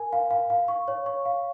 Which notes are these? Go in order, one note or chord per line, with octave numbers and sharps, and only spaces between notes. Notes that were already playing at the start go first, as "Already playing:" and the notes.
Already playing: A#4 G#5
F5
F5
F5
C#6
C#5
C#6
F5